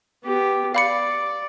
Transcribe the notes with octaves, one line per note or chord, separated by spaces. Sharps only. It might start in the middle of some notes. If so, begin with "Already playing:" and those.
B3 G4
D5 F5 B5 C#7